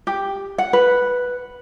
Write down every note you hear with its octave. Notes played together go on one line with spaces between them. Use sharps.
G4
F#5
B4